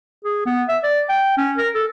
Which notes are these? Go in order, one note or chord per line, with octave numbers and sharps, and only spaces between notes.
G#4
B3
E5
D5
G5
C#4
A#4
A4